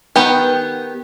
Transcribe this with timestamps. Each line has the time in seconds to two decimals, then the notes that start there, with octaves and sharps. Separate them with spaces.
0.16 D#3 B3 G4